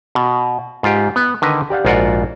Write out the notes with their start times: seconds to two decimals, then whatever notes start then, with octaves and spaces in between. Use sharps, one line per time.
0.15 B2
0.83 G#2 F4 G4
1.16 B3
1.42 D3 D#3 B4 D#5
1.70 G4 D5 F5 F#5
1.85 A#1 G#2 F4 F#4 D5 F#5